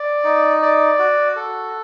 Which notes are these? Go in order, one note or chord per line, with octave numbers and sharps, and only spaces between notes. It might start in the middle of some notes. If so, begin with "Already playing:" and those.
Already playing: D5
D#4
D5
F#4
A4